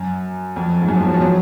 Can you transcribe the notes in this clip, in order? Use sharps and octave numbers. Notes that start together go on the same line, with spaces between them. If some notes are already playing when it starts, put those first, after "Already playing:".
Already playing: F#2
F2
G#2
F#2
F3
F#3
F3
F#3